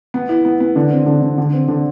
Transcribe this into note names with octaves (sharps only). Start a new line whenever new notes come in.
B3
E4
B3
B3
D3
C4
D3
D3
D3
C4
D3